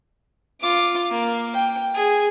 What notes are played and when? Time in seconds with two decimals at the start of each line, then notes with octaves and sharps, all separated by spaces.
0.60 F4 D6
1.10 A#3
1.54 G5
1.94 G#4